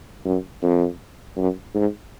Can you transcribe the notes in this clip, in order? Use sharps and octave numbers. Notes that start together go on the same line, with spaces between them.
F#2
F2
F#2
G#2